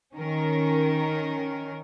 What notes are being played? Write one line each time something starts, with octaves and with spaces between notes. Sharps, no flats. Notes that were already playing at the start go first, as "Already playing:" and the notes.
D#3 C#4 A#4